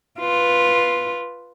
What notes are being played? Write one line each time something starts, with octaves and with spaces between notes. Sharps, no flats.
F4 B4